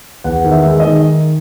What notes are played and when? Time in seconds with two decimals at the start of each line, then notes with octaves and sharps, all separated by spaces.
0.24 E2 F#5
0.44 D#3
0.51 E5
0.66 G#3
0.80 D#5
0.87 D#3